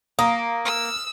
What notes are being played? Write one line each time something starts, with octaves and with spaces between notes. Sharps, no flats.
A#3 F5 A#5 D#6
E6 F6